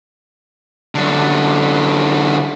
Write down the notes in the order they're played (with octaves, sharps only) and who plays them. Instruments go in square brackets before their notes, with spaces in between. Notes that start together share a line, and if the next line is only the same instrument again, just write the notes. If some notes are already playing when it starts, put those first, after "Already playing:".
[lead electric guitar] F#2 D3